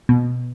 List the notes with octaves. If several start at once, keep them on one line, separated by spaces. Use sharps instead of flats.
B2